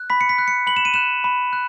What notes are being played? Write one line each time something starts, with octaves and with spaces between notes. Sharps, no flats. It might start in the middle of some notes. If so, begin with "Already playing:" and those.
Already playing: F#6
B5 B6
C#7
B6
F#6
C#7
B5 F#7
E7
D#7
F#6 E7
B5
F#6